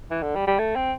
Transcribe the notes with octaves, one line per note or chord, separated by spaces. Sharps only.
E3
D3
G3
G3
A3
C4